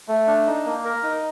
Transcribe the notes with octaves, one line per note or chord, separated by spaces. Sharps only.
A3
D4
D#4
A#3
A#4
D#4